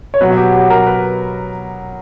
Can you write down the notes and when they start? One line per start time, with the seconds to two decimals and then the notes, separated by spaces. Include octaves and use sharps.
0.14 C#5
0.21 B2 F#3 B3 B4
0.30 F#4
0.37 G4
0.53 G4
0.70 A#4
0.87 B4